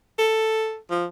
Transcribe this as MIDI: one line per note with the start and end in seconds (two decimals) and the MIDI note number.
0.19 0.77 69
0.90 1.06 53